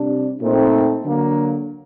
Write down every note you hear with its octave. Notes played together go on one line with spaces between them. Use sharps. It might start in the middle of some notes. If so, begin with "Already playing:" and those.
Already playing: C3 G3 D4
A#2 A3 C4 D#4
D3 F#3 A#3